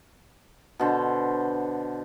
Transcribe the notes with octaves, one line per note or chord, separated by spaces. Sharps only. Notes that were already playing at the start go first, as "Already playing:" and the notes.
B2 D3 C5